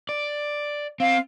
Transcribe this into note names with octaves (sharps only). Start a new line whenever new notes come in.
D5
C4 F5